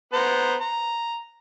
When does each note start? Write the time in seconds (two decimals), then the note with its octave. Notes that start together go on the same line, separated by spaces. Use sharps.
0.13 B3 C5 A#5
0.60 A#5